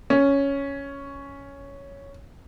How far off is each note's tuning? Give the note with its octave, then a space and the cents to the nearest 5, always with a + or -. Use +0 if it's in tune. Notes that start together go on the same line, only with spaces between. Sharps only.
C#4 +5